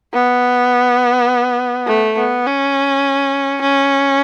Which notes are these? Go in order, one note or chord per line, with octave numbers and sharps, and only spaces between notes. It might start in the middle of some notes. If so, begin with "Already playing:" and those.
B3
A3
B3
C#4
C#4